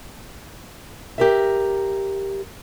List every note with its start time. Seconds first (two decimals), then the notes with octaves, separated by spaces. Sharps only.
1.18 G4 A#4 E5